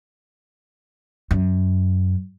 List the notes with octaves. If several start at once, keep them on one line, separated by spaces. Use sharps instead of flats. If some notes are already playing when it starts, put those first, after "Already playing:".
F#2